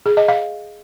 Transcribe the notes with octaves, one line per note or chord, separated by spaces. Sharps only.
G#4
D#5
F5